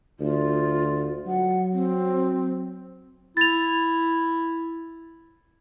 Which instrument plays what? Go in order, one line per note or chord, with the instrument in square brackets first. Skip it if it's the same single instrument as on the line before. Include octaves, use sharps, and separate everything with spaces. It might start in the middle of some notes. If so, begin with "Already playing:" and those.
[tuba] D2 [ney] F4
[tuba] F#3 [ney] F#5
[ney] C4
[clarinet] E4 [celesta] A6 F7